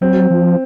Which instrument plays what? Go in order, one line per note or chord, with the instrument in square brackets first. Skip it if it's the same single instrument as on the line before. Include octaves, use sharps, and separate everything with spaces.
[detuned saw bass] F#3 [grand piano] C4
[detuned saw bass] F3